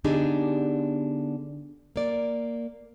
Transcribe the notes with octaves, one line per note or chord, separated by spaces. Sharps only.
D3 B3 D4 D#4 G4 G#4
A#3 D5